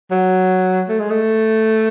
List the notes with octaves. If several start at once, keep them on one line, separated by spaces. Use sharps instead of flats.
F#3
A3
G#3
A3